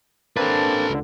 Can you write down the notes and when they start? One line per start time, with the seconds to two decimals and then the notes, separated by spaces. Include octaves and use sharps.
0.37 A#3 C4 D4 A4 B4
0.90 C#2 D3